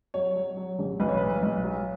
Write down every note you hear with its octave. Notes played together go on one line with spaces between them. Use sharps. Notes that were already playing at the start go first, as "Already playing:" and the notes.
F#3 C#5
F#3
F#3
A1
B1 B4
C#5
A2 B4
B1
F#3